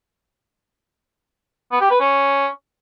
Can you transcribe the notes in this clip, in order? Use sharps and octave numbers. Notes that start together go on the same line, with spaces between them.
B3
G4
B4
C#4